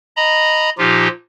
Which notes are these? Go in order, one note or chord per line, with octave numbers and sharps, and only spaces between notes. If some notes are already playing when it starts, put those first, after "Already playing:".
D#5 A#5 B5
A#2 F3 D#4 F4 G4